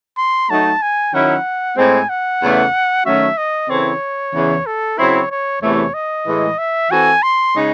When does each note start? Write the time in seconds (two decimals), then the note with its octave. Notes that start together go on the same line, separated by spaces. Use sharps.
0.18 C6
0.49 F#3 A3 D#4 A5
0.82 G#5
1.14 D#3 F#3 C#4 E4 F#5
1.77 A2 G#3 C4 G#5
2.09 F#5
2.42 E2 C#3 E3 A3
3.06 D#3 F#3 A3 C#4 F#4 E5
3.38 D#5
3.70 C#3 E3 C4 E4 A4 C#5
4.34 E2 C#3 E3
4.66 A4
4.98 C#3 F#3 C4 E4 C#5
5.31 C#5
5.62 E2 C3 E3 A3 C#5
5.94 D#5
6.27 A2 E3 G#3
6.58 E5
6.91 E3 C4 F#4 A4 G#5
7.23 C6
7.55 C#3 G#3 D#4 G#4